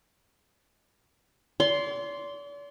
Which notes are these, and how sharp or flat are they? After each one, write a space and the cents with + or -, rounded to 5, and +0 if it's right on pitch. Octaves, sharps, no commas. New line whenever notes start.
D5 -40 C6 +0